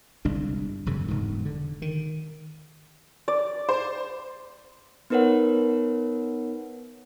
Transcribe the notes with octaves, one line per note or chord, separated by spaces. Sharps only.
G1 C2 G#3 D4
E1 F#2 C#3
E1 D2 G#2
D3
D#3
D5
C5
B3 D#4 A#4 B4 C#5 F#5